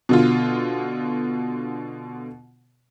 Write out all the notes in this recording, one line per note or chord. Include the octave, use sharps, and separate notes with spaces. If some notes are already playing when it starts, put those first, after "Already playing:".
B2 D3 F4